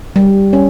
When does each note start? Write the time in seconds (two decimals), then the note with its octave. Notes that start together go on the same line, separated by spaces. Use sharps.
0.16 G3
0.53 C#4